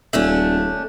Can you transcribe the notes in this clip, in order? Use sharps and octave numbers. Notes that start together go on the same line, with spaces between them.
D#1 A3 C#4 D4